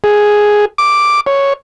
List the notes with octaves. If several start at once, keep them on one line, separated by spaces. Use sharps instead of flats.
G#4
D6
C#5